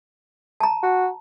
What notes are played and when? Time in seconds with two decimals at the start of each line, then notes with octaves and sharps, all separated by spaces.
0.60 A5 A#5
0.83 F#4